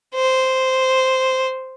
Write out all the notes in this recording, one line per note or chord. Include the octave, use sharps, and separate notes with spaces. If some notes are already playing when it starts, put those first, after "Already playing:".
C5